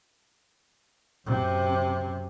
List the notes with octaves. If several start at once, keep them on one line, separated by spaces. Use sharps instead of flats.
F#2 C3